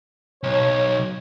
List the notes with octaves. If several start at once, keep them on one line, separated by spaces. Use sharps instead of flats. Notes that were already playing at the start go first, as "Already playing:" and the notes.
B1 C#5